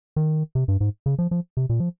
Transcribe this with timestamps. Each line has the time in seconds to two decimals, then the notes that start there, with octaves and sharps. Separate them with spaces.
0.16 D#3
0.55 C3
0.68 G2
0.80 G#2
1.06 C#3
1.19 F3
1.31 F3
1.57 C3
1.69 A#2
1.80 F3